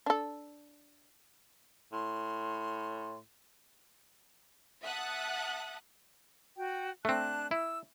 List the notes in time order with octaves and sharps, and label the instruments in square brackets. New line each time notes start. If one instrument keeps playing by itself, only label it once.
[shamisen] D4 A4
[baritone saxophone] A2 [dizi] C6
[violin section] E5 F#5 A5 D#6 F#6
[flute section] F#4 G5
[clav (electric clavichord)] A3 C4 [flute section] D4 A5 F#6
[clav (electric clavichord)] E4 [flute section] E6